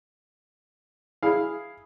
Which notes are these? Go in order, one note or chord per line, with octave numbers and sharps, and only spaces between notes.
E4 G#4 F5